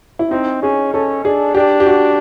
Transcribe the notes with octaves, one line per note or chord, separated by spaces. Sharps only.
E4
C4 D#4
C#4 G#4
C#4 A4
D4 G#4
D4 G4
G4
F#4